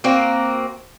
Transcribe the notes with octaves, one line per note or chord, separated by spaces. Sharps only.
A#3 C4 F#4